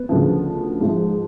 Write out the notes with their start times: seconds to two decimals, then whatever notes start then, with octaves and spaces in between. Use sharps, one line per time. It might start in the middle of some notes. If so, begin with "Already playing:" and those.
Already playing: B3
0.09 D2 C#3 F3
0.81 G#2 F3